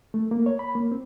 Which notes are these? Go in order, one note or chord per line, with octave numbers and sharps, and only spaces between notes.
A3
A#3
C#5
B5
A#3
C4